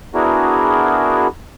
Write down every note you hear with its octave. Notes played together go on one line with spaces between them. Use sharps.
B3 D4 E4 F#4 G#4 A#4